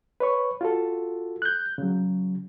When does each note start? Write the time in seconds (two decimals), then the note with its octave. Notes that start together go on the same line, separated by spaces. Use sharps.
0.20 B4 C#5 C#6
0.61 F4 F#4 A4
1.42 F#6 G6
1.78 C#3 F#3